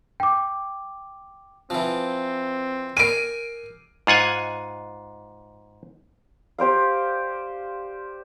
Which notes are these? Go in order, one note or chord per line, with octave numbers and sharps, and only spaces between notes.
G5 D6
E3 F3 C4
A#4 G#5 D7 D#7
G#2 F4 F#5 G#5
G4 C5 D5 F5